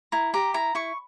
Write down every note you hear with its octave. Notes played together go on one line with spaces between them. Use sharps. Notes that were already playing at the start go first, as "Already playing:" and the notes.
E4 A#5
G4 A#5
E4 A#5
E4 C#6